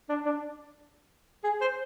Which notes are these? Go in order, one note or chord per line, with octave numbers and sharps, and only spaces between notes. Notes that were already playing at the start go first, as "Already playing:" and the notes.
D4
D4
G#4
C5